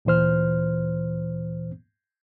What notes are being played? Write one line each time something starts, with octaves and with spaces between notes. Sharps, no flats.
D2 A#2 E3 C5 F6